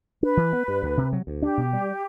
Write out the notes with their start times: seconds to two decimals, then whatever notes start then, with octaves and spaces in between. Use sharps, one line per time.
0.22 D4 B4
0.37 E3
0.53 B3
0.68 G2
0.83 D2
0.98 C3
1.13 F#3
1.27 D2
1.42 D4 G4
1.57 B2
1.73 G3